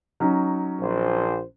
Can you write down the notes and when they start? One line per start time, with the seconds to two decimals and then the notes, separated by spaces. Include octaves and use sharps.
0.20 F#3 C#4 D#4
0.80 A#1 C5